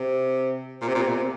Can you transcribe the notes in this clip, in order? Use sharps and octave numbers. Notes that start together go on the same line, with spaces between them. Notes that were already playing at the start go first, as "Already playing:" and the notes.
Already playing: C3
A#2
C3
A#2
C3
A#2
C3